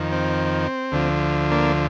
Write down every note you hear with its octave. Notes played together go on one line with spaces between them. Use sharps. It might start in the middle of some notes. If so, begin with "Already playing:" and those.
Already playing: F2 D#3
C4
D2 D3 F3
A#3 D4